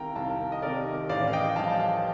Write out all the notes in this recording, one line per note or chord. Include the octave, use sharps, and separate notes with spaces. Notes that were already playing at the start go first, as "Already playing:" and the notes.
Already playing: C2 C3 D#3 A#4 F5 G5 A#5
C2 F5 A5
D#5
C3 D#3 A#4 D5
A1 D5 F5
F5
D#5 G5
G2 F3 F5 A5
F5 A5